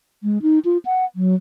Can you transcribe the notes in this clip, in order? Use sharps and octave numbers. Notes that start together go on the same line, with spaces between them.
G#3
D#4
F4
F#5
F#3